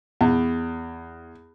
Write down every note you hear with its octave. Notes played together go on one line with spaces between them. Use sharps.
E2